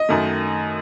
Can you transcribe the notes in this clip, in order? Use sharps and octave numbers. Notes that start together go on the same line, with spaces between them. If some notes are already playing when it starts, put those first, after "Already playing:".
Already playing: D#5
F#2 D#3 A3